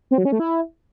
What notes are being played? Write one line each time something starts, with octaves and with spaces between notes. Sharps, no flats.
C4
F#3
C#4
A3
E4